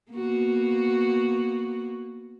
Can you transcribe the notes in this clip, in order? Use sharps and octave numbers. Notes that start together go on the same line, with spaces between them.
A#3 B3 F#4